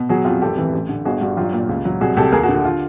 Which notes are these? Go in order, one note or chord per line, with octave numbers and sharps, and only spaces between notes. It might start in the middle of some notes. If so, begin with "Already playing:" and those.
Already playing: B2
F#3 F#4 G#4
F2 F4 G4
G#1 G4 A4
E3
A1
D3
G1 F#4 G#4
G2 F#4
F#3 F4 G4
A#2
C#2
F#3
C2 F#4 G#4
C2 G4 A4
D#2 G#4 A#4
F#4 G#4
D3
F#4
F4